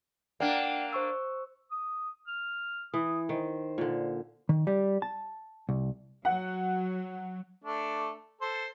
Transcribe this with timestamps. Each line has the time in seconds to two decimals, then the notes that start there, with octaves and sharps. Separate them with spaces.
0.40 A#3 D4 D5 F#5 G5
0.93 C5 C#6 E6
1.71 D#6
2.27 F6
2.94 E3 D#6
3.29 D#3 C5
3.78 A#2 D3
4.49 D#3
4.67 G3
5.02 A5
5.69 C2
6.25 F#3 F#5
7.64 A3 D4
8.41 A4 C5